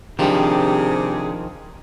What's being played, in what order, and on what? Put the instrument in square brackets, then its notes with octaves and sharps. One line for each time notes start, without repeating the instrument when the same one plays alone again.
[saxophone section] C3 G#4 [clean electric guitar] D#3 F3 [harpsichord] G3 D4